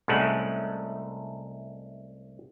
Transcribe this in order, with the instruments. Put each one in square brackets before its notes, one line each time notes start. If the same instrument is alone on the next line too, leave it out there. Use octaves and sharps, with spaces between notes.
[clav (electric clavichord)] C2 A2 G#3 A3 C#4 F#5